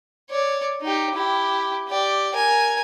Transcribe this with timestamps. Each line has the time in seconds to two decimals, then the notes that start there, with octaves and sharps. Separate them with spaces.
0.30 C#5 D5
0.82 D#4 G4
1.15 E4 G4
1.88 G4 D5
2.34 A#4 G#5